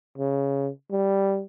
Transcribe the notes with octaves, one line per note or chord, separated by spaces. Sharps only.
C#3
G3